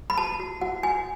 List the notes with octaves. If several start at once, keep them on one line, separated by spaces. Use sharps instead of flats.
B5
F#4 A5
F#4
F#4 F#5
F#4 G#5